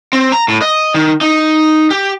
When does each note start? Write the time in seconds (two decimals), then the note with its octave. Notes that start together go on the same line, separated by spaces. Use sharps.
0.13 C4
0.32 A#5
0.48 A2
0.62 D#5
0.95 D#3
1.21 D#4
1.91 G4